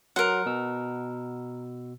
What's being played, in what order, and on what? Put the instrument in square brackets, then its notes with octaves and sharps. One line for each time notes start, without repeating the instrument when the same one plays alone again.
[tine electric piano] F#3 C6 [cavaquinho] A#4 F#5
[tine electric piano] B2 E6